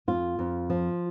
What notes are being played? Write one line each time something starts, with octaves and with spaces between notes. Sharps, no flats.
F2 F4
F2
F3